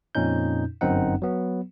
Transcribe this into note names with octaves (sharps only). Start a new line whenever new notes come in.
F2 A#2 C#4 D#4 G6
G1 F#2 C4 D#4 F#5
F#3 B3